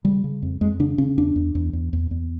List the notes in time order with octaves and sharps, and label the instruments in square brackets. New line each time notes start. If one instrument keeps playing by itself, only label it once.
[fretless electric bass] C#3 G3
C#3
F2
F2 G#3
C#3 D4
C#3 C#4
E2 D4
E2
E2
E2
E2
E2